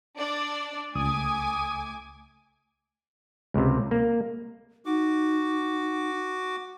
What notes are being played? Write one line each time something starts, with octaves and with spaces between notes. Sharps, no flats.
D4 D5
C#2 A3 G#5 D6 D#6
C#2 C3
A#3
D#4 F#4 D6